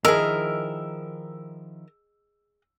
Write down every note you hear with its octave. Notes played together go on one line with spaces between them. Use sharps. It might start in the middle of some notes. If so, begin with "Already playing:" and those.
D#3 F3 E4 G#4 A#4 D#5 E6